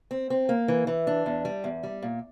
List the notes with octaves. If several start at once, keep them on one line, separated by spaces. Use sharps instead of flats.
C4
C4
A#3
E3
E3
D4
E2
G3
E2
G3
A#2